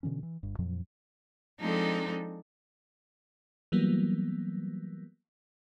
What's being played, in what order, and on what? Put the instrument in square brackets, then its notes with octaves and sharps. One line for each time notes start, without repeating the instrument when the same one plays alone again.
[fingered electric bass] B2 D3 E3 C#4
E3
G1 G2
F2 A#2 F3 F#3
[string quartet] F3 G#3 C4 D4 D#4 A4
[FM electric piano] E3 F#3 G3 A#3 B3